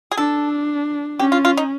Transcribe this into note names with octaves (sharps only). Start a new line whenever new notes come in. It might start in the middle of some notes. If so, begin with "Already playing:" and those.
G#4
D4 A4
C#4 G4
F4
F4
D#4